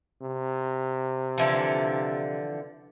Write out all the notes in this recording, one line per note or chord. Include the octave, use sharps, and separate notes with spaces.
C3
D3 E3 F3